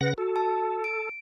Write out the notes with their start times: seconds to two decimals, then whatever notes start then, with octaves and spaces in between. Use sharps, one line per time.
0.01 C#3 B4 F#5 A#6
0.18 F#4 A4
0.36 A5
0.84 D7